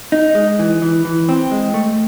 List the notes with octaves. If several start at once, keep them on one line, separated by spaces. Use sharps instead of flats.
D#4
G#3
E3
E3
E3
C4
G#3
A3